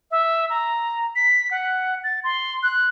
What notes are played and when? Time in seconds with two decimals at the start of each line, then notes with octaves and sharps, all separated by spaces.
0.11 E5
0.50 A#5
1.16 B6
1.51 F#5
2.04 A6
2.24 C6
2.63 F#6